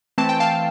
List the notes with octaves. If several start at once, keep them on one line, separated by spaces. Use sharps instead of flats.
E3 A3 C4 A5
G5
F5 A5